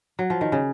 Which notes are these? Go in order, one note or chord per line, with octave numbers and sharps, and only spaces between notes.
F#3
F3
D#3
C#3